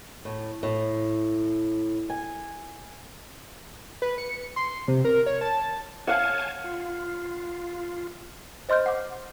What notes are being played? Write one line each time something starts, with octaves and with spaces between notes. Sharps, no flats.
A2
A2
G#5
B4
C#7
C6
C3
A#4
C#5
A5
C#5 F5 F#5 G#5 A5
F4
C5 D#5 C6 F6 G6
F#5 D6